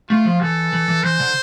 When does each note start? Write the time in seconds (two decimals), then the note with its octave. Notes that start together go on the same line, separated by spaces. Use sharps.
0.10 A3 F4
0.25 F3
0.41 E3 A4
0.73 E3
0.88 E3
1.03 E3 C5
1.20 D3